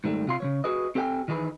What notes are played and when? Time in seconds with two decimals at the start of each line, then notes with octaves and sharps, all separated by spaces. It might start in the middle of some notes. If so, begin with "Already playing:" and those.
0.04 G#2 D#3 G3 A3
0.27 C3 F4 C6
0.40 C#3 F3 C#5
0.64 F#4 G#4 B4 D#5
0.95 C4 G4 A4 D#5 G5 G#5
1.28 D#3 E3 D#4 G#4 B4